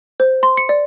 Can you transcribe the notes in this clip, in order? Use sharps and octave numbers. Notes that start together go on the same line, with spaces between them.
C5
C6
C#7
D5